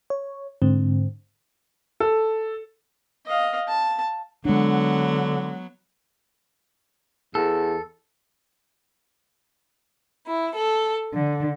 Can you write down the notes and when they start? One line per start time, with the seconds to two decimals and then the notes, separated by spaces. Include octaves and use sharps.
0.10 C#5
0.62 G#2 D3 C4
2.00 A4
3.26 D#5 F5
3.68 A5
4.45 D3 F#3 G#3 B3 D4
7.35 E2 A4
10.27 E4
10.55 A4
11.15 D3